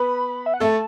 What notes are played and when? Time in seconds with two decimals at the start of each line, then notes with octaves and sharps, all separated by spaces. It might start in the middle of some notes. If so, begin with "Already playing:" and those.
Already playing: B3 B4 B5
0.46 E5
0.54 F#5
0.60 A3 A4 A5